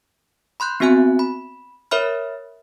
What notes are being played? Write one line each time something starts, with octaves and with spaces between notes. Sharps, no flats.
B5 C6 F#6 G6
B3 C4 F#4 E5 G#5 F#6
B5
A#4 C#5 E5 B5 F6